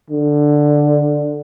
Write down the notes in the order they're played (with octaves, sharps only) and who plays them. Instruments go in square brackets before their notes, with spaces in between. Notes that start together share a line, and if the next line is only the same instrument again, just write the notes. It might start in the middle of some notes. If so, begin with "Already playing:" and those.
[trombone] D3